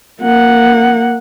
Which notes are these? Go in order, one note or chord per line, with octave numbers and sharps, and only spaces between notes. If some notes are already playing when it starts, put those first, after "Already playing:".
A#3 F#5